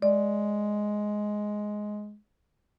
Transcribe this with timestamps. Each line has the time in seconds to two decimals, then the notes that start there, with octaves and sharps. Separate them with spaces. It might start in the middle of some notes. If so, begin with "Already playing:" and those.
0.02 G#3 D5